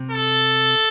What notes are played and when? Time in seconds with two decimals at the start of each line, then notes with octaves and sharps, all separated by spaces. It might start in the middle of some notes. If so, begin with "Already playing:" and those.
Already playing: C3
0.11 A4